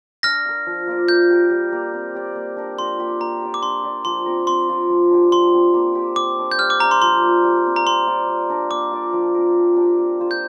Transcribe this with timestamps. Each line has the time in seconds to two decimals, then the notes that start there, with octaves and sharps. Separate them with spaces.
0.23 D4 F6 A#6
0.45 A#4 F5
0.66 F3
0.87 A#3 F4 D5
1.08 A#3 G6
1.30 G4 A#4
1.50 G3
1.72 A#3 G4
1.93 C4
2.15 G4 D5
2.35 A#3
2.57 D4 A#4
2.79 F3 C6
3.00 A#3 G4
3.20 A#3 A#5
3.42 G4 D5
3.54 D6
3.62 D4 C6
3.84 G4 D5
4.05 F3 C6
4.26 C4 A#4
4.47 C4 C6
4.69 F4 A#4
4.89 F3
5.11 D4 G4
5.32 F3 C6
5.54 C4 G4 C5
5.74 A#3
5.95 G4 C5
6.16 A#3 D6
6.39 D4 A#4
6.51 G6
6.59 G3 F6
6.70 D6
6.80 D4 G4 D5 A#5
6.91 C6
7.02 F3 C6
7.23 A#3 F4
7.44 G3
7.65 C4 G4
7.76 A#5
7.86 C4 C6
8.07 F4 D5 F5
8.28 G3
8.49 D4 A#4
8.71 A#3 D6
8.91 F4 D5
9.13 F3
9.34 C4 A#4 F5
9.56 F3
9.76 D4 G4
9.98 A#3
10.19 F4 C5 F5
10.31 G6